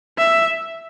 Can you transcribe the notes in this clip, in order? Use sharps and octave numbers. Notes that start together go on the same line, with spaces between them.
E5